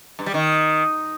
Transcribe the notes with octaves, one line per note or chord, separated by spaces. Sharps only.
G2
G3
D#3